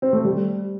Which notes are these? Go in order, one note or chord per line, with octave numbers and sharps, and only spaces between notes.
C4
A3
G3